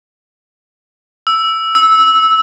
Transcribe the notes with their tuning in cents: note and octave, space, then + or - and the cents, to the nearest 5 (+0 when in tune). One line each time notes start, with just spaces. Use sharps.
E6 +5
E6 -15